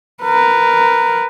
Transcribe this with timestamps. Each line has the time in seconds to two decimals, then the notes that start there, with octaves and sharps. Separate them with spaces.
0.23 A#4 B4